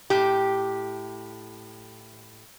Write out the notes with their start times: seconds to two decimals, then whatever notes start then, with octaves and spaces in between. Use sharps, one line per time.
0.10 A2 G4